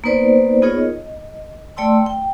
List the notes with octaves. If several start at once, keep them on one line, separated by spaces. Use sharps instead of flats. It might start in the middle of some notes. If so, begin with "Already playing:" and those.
A#3 B3 D#4 B4 C5 D5
B3 D#4 F4 G#4 A#4 C#5
D#5
A3 D5 G5 A5 C6 E6
G5